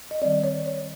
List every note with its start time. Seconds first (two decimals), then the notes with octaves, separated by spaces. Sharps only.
0.11 D#5
0.22 D#3 G3 C4 D5
0.44 C#5
0.66 C#5